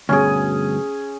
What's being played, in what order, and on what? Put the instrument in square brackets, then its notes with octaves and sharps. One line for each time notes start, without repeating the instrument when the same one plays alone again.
[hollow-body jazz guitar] D2 G2 B2 [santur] C#4 G#4